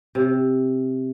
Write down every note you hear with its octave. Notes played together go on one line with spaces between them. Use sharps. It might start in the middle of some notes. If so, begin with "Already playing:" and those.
C3